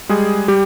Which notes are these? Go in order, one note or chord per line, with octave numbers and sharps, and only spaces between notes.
G3 G#3 G#4
G3 G4